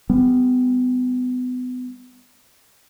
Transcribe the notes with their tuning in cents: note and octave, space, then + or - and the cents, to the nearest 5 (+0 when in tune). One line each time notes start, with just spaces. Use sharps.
G3 +30 B3 +30